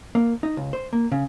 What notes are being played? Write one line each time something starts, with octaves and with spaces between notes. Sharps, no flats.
A#3
D#4
C#2
C5
A#3
C#3